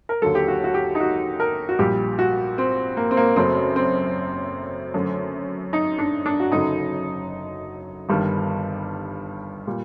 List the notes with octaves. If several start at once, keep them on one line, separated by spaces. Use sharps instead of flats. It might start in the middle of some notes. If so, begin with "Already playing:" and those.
A#4
D#2 D3 F#3 A4
G4
F#4
F#4
G4
D#4
F#4
A#4
F#4
A#1 A#2 G3 G4
F#4
C4
A#3
C4
A#3
F#1 F#2 F#3 A3 C4
C4
F#2 D3 A3
D#4
D4
D4
F#4
F#1 F#2 D3 F#3 D#4
G1 G2 D#3 G3
A#2 G3